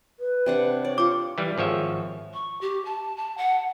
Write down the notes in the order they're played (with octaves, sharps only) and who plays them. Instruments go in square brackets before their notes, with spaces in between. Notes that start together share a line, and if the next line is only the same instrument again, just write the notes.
[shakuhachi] B4
[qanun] C3 D4 F#5
[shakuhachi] C#5 [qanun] D5
[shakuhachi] F4 [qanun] C5 C#6 [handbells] D6
[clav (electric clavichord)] E3 G3
G#1 F3 C#5 E5
[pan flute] C#6
G4
A5
A5
F#5